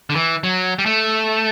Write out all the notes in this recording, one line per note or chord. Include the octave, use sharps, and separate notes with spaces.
D3
E3
F#3
G3
A3